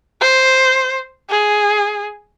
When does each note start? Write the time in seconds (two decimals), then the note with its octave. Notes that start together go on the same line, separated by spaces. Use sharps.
0.21 C5
1.30 G#4